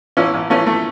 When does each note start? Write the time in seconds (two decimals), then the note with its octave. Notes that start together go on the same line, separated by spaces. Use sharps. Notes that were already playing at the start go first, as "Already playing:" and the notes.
0.17 A1 C#4 E4
0.34 A1
0.50 E3 A3 C#4
0.67 A3